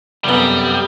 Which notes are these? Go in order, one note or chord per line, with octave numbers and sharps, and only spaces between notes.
F1 F#2 G3 B3